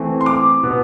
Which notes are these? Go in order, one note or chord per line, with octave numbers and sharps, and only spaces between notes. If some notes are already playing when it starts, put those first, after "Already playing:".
Already playing: E3 A3 C4
C6
D6
B2 B3